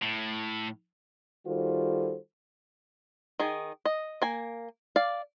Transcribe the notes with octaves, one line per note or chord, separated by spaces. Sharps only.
A2
D#3 G3 F4 F#4 A4 C5
D#3 G#4
D#5
A#3 G#5
D5 F5